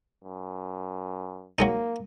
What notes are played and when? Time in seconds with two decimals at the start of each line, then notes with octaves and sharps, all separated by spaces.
0.24 F#2
1.59 F#3 G#3 A#3 D#4